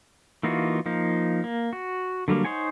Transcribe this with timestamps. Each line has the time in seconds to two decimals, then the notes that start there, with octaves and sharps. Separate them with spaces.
0.43 E3 A#3 D#4 F4 F#4
0.86 F3 A#3 D#4
1.44 A#3
1.73 F#4
2.28 D3 F#3 G3 A#3
2.45 D#4 C5 C#5 F#5 G#5